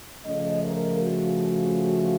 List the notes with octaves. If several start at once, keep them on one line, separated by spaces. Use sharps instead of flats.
C#3 F3 A3 C#4 D#5
A#4
F#4